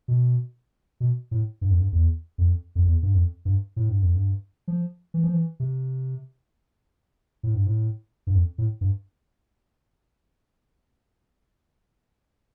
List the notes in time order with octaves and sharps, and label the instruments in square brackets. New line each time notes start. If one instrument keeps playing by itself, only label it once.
[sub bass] B2
B2
A2
G2
F2
G2
E2
F2
F2
E2
G2
F2
G2
A2
G2
F2
G2
F3
E3
F3
E3
C3
A2
G2
A2
G2
F2
A2
G2